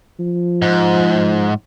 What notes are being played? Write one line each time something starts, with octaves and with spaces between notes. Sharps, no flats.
F3
G#2